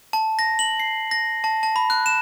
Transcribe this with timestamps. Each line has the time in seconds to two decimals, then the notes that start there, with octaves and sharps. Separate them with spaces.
0.13 A5
0.39 A#6
0.59 F#7
0.80 C7
1.11 A#6
1.44 A5
1.63 A5
1.76 B5
1.90 F#6
2.06 E7